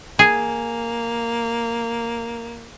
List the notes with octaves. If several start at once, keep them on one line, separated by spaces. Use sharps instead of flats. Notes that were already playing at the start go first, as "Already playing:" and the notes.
A#3 G#4